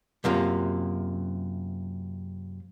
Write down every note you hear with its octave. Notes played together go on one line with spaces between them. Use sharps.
F#2 C3 A#3 F4